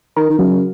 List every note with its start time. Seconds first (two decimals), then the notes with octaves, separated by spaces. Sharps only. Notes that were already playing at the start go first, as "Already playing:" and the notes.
0.16 D#3 A#4
0.30 D#3
0.39 C#3 F#3